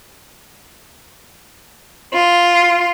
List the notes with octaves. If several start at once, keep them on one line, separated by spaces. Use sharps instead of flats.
F4